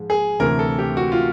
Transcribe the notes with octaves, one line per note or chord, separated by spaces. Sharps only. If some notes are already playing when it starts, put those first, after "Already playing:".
Already playing: G#2 F3 G#3
G#4
D2 C3 E3 A3 A#4
A4
G4
F#4
F4